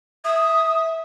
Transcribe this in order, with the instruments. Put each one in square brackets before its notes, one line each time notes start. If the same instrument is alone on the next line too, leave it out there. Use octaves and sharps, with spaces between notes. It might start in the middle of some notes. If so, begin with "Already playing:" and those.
[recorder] E5 [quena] D#6